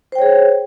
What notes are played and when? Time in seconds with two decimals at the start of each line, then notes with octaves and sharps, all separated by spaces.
0.12 C5
0.15 G5
0.19 C#5
0.22 G#4